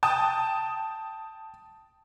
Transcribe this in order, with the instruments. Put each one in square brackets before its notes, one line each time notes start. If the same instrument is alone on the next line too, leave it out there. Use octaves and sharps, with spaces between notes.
[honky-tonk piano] G5 A5 D#6